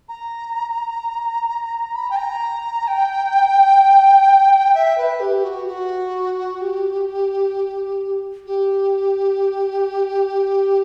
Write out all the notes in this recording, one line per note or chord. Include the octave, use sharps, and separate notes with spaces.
A#5
B5
A#5
G5
A#5
G5
E5
B4
G4
F#4
F#4
G4
G4